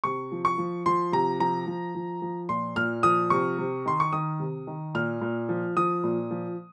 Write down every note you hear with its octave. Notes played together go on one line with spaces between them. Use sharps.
C3 C#6
F3
C#6
F3
F3 C6
C3 A#5
F3 A#5
F3
F3
F3
A#2 C6
A#2 F6
F3 D#6
C3 C#6
C3
D#3 C6
C#6
D#3 D#6
C3
D#3
A#2 F6
A#2
F3
F3 D#6
A#2
F3